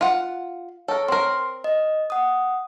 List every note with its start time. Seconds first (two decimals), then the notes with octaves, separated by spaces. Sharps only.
0.01 F4 F#5
0.88 A4 A#4 C#5
1.08 C4 A#4 C6
1.64 D#5
2.10 F#5 D#6